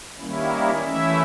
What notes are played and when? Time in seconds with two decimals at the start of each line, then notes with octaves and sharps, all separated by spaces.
0.18 D#3 G3 A#3 C#4 E4
0.83 E3 A3 C#4 E4 E5